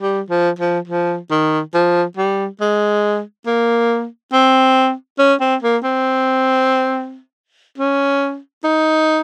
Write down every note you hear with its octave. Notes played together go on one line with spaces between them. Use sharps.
G3
F3
F3
F3
D#3
F3
G3
G#3
A#3
C4
C#4
C4
A#3
C4
C#4
D#4